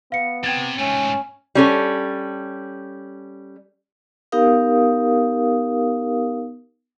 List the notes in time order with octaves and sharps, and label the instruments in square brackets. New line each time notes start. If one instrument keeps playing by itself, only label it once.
[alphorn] B3 [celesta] F5 C#7
[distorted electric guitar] C3 [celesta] G5 G#6 A6
[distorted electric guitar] G#2 A3 [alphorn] C#4
[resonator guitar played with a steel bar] G3 C#4 A4
[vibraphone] B3 D#4 G4 A#4 F5 D#6